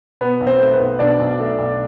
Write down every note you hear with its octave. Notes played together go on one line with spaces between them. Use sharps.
B2 B3 B4
B1
C4 C5
A3
B3 B4
B1
B2 D4 D5
B1
A3
B1